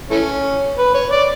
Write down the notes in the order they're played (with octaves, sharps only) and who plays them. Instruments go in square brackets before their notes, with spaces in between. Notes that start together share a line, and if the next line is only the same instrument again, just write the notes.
[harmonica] E3 A3 C#4
B4
C#5
D5